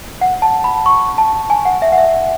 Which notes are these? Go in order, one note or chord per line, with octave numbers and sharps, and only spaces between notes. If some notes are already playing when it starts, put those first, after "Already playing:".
F#5
A5
B5
C#6
A5
G#5
F#5
E5
F#5
E5